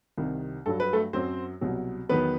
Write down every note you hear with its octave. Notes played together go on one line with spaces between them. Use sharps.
C2 C3 D#3
G2 F#3 A4
B4
A3 A4
F#2 F#3 C4 C5
C2 B2 F#3
E2 D#3 F#3 B3 B4